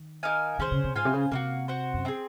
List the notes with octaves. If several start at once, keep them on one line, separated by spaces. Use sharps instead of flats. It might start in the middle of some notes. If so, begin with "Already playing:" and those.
Already playing: D#3
D#4 A#4 F5 G#5
D#3 C#4 G#4 C5
C#3
C3
G#2 F4 C5 F5 G#5
C3
C#3
C3 A#3 D#4 F#4
F#4 C5 F#5
F#2
C4 D#4 G#4